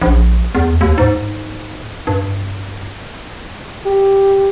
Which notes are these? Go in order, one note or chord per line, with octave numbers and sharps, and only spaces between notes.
A#1
E2
D#2
G#2
G2
G4